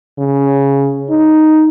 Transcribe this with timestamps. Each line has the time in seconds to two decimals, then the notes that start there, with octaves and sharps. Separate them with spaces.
0.18 C#3
1.10 D#4